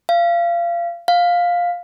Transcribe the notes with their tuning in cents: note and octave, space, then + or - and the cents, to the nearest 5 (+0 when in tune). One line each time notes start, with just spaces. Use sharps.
F5 -25
F5 +10